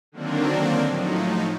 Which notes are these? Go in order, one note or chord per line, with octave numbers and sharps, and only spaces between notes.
D3 D#3 F#3 A#3 C4 D4
A2 F3 F#3 D#4